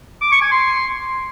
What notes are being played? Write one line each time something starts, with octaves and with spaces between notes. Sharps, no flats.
D6
C#6
G#5
C6